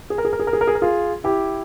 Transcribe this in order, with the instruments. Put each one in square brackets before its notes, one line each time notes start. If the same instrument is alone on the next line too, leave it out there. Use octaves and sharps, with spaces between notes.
[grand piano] G#4
A#4
G#4
A#4
G#4
A#4
G#4
A#4
G#4
A#4
F4 G#4
E4 G4